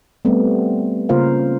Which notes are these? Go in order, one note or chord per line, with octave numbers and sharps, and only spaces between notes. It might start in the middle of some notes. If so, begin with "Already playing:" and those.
G3 A3 B3 C4
C#3 A#3 F4 A#4 C5 F5